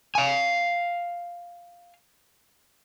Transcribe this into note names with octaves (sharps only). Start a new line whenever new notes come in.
F5 G#5